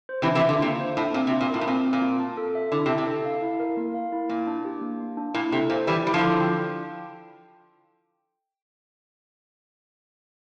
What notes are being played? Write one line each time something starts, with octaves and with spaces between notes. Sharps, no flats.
C5
C3 E3
D4
C3 E3
D3 F4
C3 A#3
C5
A2 D4
A#2 C4
C3
F4
A#2
A2 A#4
A2
A#2 C4
C4
A#2
F4
A5
A4
E5
D3 E4
C3
A5
C3
A4
F5
E4
A#4
A#3
F5
E4
A#2 A#3
D4
G4
A#3
A#3
D4
A#2 E4
C3 A4
A#2 C5
E3 G3 E4
G3 E4
D3 F3
A4
G5